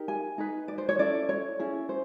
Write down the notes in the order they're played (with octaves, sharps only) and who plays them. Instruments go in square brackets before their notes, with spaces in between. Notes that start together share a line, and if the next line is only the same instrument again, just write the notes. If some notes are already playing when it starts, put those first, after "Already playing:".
Already playing: [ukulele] D#4 G4 A#4
G#5
D#4 G#4 B4
D5
C5
C#5
C#4 E4 A4 D5
C#5
C#4 E4 G#4
C5